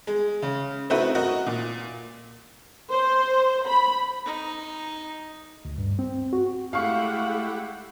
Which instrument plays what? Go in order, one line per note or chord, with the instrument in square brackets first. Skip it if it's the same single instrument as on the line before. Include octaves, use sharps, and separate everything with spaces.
[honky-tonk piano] G#3
C#3
A3 C4 D#4 E4 F#4 B4
F#4 A#4 D#5 F#5
A#2
[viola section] C5
B5
[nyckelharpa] D#4
[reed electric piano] D2
G2
C4
F#4
[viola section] G#3 A3 F#5 [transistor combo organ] E4 G4 [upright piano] F5 C#6